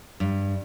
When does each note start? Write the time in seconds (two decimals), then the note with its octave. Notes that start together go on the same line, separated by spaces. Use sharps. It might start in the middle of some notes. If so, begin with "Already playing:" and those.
0.20 G2